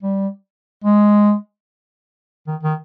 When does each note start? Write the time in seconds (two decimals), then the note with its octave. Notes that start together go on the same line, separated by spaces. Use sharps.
0.03 G3
0.84 G#3
2.47 D#3
2.63 D#3